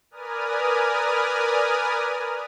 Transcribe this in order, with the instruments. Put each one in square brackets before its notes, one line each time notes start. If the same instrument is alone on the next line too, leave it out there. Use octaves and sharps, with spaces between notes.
[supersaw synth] A#4 B4 D5 G#5 D#6 F6